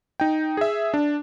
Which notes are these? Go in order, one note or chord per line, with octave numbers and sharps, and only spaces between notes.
D#4 G5
G#4 E5
D4